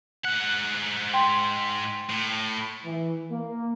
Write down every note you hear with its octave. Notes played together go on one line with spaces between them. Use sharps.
G#2 F#5 F#6
G5 C6
A2
E3
A#3